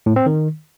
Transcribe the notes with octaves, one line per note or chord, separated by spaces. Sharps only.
A2
C4
D#3